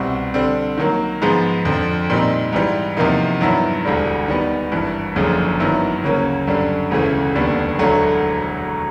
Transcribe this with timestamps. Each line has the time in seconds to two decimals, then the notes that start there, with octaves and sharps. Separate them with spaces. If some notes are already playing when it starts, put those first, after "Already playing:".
Already playing: C2 B2 G3 C4
0.34 D3 G3 C4
0.77 D#3 F#3 A#3
1.22 G#2 F3 G#3 B3
1.65 F2 D3 F3
2.10 A#2 G3 C4 D#4
2.53 G#2 E3 G3
2.97 E2 C3 F3 A#3 D#4
3.41 G2 D#3 F#3 B3 E4
3.85 E1 D2 D3 G3
4.28 D#3 G3 B3
4.72 G#1 G2 E3
5.16 F#1 F#2 D3 F3 G#3
5.60 G2 D#3 F#3 B3 E4
6.03 D2 C#3 F#3 A#3 C#4
6.47 F#2 D3 G3
6.90 E1 D2 C#3 E3 A3
7.35 F1 D#2 D3 G3 B3
7.79 E1 D2 D3 F#3 A3